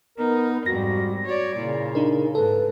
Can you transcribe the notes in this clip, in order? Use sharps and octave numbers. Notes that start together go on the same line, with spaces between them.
B3 D#4 A#4
F2 G#2 G3 F#4 A#6
F#4 C#5 D5
A#2 C#3 E4
D4 D#4 A#4
G#2 A4 B4